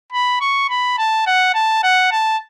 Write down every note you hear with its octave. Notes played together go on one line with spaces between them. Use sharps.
B5
C#6
B5
A5
F#5
A5
F#5
A5